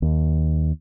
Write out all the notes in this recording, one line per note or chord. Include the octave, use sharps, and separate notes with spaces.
D#2